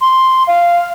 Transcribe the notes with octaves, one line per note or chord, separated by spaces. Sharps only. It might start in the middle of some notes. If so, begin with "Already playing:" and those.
C6
F5